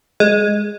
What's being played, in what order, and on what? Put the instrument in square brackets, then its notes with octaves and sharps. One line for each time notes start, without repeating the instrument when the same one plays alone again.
[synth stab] G#3